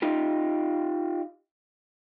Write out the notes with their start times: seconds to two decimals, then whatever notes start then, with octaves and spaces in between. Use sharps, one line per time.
0.02 D#4 F4 G4